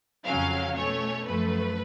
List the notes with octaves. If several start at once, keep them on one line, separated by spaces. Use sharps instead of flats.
F2 C#3 F#3 C#4 F5
B2 A3 C#4 C#5
F#2 F3 A3 B4